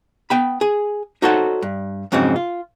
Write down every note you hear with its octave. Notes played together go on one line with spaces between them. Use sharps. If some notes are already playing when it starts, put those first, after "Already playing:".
B3 G5 B5
G#4
D#4 F#4 A4 C5 C#5 F#5
G2
F2 G#2 C#3 F#3 C4
F4